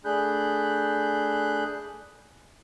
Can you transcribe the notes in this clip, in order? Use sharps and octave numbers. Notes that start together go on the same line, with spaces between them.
A3 D4 G#4 B5 F#6 G6